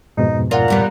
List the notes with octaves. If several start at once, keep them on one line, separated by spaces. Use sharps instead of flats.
F2 G#2 B2 D#4
A#2 F4 F#5 A#5
E2 G3 B3